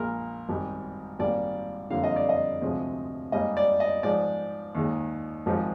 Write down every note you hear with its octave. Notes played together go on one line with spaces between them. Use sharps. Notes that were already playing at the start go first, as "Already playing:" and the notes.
Already playing: A#1 A#2 G#3 A#4
G#1 G#2 G3
G#1 G#2 G3 A#3 D5
F2 D3 G3 A#3 F5
D#5
D5
D#5
D2 C3 F3 G#3
G#2 G3 A#3 D#5
D5
D#5
G#2 F3 G#3 D5
D#2 D#3 G#3
G#1 G#2 F3 G#3